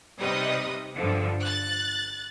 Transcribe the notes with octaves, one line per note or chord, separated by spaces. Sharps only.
C3 G3 D#4 B4 D#5 D#6
G2 D3 F3
F#6 A6